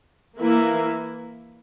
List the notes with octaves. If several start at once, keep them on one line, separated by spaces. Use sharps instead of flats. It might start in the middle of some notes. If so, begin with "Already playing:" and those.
E3 A#3 E4